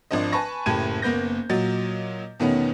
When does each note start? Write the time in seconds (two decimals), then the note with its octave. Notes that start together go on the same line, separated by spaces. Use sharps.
0.11 G#1 F3 D4 C5 D#5
0.32 B4 G#5 A5 B5 C#6 A#6
0.66 F#1 A2 G4 A5 G#6 D#7
1.02 F#1 A#3 B3 G6 A#6
1.50 A#2 F#3 D#5 A6
2.40 E2 B2 D#3 A3 B3 C#4